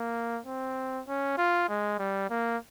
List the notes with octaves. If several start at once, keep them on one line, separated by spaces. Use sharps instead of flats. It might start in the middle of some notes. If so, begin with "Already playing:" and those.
Already playing: A#3
C4
C#4
F4
G#3
G3
A#3